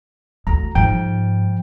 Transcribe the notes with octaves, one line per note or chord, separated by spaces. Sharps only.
D2 A#5
G#2 F3 G5